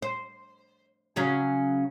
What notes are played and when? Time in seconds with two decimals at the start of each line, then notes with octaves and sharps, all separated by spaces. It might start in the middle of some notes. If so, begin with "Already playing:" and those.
0.02 C5
1.16 C#3 F#3 C#4